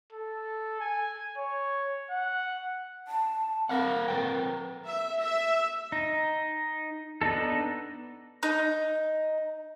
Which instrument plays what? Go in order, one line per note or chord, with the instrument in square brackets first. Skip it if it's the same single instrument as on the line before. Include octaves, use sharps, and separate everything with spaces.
[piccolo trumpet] A4
G#5
C#5
F#5
[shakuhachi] A5
[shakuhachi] C4 [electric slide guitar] A#4 F5 F#5
[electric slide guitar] A#4 B4 G5
[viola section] E5
E5
[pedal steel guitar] D#4
B3 D4 D#4 A4
[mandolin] D#4